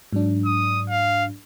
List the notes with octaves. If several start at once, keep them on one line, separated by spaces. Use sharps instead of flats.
G#2 F#3 D4
D#6
F5